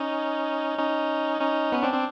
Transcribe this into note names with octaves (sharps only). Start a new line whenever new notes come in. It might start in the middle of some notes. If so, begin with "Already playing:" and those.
Already playing: C#4 D#4
C#4 D#4
C#4 D#4
B3 C#4
C4 D4
C4 D4